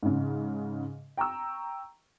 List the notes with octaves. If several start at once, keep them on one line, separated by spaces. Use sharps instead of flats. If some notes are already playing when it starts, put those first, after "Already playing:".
G#2 C#3
G5 A#5 C#6 E6